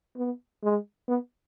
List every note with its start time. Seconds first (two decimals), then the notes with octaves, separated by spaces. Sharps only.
0.17 B3
0.63 G#3
1.08 B3